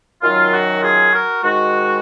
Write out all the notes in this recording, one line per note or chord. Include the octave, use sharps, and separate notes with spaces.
F#2 D#3 F#3 F4
F#4
F4 G#4
F#4 A#4
G#2 D#3 G#3 F#4